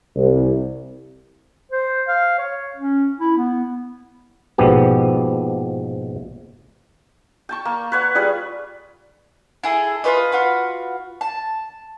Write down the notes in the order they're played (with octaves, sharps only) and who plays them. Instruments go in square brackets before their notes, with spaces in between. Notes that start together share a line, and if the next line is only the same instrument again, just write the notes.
[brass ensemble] C2
[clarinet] C5
F5
C#5
C#4
E4
B3
[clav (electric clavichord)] A#1 G#2 B2 F3 B3 G4
[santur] G5 A5 C#6
A#3
B4 C#5 F#5
G3 F4 G#4 B4
[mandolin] E4 G#4 A4
F4 G4 B4 D#5
F4 F#4 B4
A5